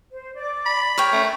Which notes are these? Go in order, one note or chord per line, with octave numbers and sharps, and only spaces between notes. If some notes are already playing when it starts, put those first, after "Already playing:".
C5
D5 D6
B5
A#4 C#5 G5
A3 C#4